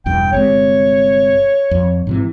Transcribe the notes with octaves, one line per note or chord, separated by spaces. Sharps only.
E1 E2 G2 G5
G1 C3 G#3 C#5
F2
G#2 C3 E3